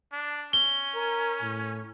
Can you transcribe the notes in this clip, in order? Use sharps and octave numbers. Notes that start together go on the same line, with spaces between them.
D4
C#4 G7
A#4
A2